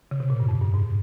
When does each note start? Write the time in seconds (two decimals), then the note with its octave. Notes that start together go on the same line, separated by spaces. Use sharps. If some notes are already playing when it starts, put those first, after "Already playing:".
0.11 C#3
0.20 C3
0.30 A#2
0.40 G2
0.48 F2
0.61 G2
0.74 G#2